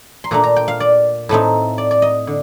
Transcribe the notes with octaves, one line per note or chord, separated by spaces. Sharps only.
C6
A#2 A3 D4 A#5
A#5
G5
F5
D5
A2 A3 C4 D#4
D5
D5
D#5
D3